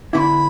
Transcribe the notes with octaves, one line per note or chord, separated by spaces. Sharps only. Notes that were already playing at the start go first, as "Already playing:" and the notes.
D3 B3 E4 B5 D6